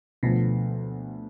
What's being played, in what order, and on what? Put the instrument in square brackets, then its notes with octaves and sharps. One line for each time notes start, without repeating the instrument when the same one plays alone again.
[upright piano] D2 D3 F3 [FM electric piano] B2